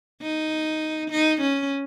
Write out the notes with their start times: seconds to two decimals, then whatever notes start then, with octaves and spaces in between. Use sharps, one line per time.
0.22 D#4
1.11 D#4
1.41 C#4